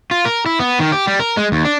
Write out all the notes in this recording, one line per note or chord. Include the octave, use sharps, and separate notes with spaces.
F4
A#4
E4
B3
D#3
G4
G3
A#4
G#3
D#2
D4